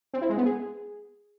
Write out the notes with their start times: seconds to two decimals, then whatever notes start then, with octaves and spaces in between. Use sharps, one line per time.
0.13 C4
0.21 E4
0.29 G#3
0.37 B3
0.45 G#4